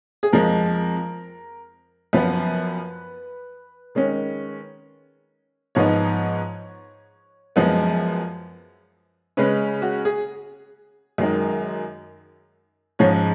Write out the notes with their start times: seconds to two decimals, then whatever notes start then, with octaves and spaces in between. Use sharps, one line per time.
0.23 G#4
0.33 F2 F3 G#3 A#4
2.13 F#2 F3 B3 B4
3.95 D#3 G#3 C#4
5.75 G#2 F3 B3 D#4 C#5
7.56 F#2 F3 G#3 B3
9.37 C#3 G#3 C#4 B4
9.82 F#4
10.05 G#4
11.18 F#2 D#3 G#3 D#4
12.99 G#2 F3 G#3 C#4 C#5